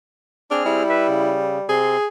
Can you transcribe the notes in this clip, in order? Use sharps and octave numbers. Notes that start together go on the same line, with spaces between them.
C4 D4 G#4 F6
G3 E4
B4 E5
C#3
C3 C4 G#4 C6